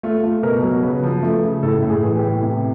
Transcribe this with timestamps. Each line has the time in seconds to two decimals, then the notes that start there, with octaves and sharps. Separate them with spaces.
0.03 A3 F4
0.23 A3
0.43 B2 A#4
0.63 F#3
0.83 C#3 B4
1.03 F3
1.22 A3
1.43 C#3
1.62 A2 A4
1.82 A2
1.90 G#4
2.03 E3
2.16 G4
2.23 A2
2.42 C3